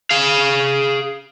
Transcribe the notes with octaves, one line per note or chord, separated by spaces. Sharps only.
G#4 F5